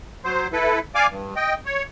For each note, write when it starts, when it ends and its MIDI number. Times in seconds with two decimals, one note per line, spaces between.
0.24 0.47 54
0.24 0.47 72
0.53 0.79 64
0.53 0.79 69
0.53 0.79 71
0.95 1.07 74
0.95 1.07 77
0.95 1.07 80
0.95 1.07 86
1.11 1.34 43
1.36 1.54 75
1.36 1.54 79
1.66 1.83 73